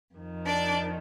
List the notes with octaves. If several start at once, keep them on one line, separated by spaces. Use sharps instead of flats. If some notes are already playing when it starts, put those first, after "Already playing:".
F2 D#3
D4 D5